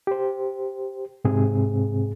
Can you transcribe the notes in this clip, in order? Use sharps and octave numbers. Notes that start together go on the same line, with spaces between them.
G4 C5
G#2 C3 C4 G#4